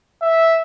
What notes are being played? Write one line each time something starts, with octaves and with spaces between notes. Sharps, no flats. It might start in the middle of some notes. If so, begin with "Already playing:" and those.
E5